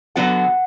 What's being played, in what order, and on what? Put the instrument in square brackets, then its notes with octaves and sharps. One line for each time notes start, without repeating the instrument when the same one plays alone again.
[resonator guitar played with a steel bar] D3 F#3 B3 F#4 A4 [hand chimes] F#5